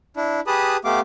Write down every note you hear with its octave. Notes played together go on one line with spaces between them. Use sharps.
D4 E4
G4 G#4 B4 A5 B5 D#6
A3 B3 G4 F5 D6